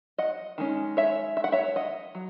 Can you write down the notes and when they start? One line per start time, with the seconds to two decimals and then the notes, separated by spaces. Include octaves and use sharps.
0.18 D#5 F#5
0.58 D#3 G#3 C#4
0.97 C#5 E5
1.37 E5
1.44 F#5
1.52 C#5 E5
1.76 D#5 F#5
2.15 F#3